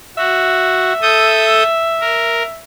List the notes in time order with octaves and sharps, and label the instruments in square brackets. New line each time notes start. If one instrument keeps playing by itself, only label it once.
[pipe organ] F#4 [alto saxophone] E5
[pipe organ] A4 D#6 G6
A#4